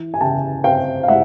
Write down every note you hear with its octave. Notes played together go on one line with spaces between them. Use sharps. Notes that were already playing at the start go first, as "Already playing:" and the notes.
Already playing: E3
G#5
C#3 G5 A5
C4 F5 G5
F5
G#3 E5 F#5